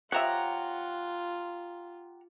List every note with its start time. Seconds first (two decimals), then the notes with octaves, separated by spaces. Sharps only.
0.12 F3 F4 G4 C#5 E5 F#5 A#5